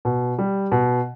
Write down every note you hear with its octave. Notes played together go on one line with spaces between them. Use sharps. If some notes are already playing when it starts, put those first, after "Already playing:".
B2
G3
B2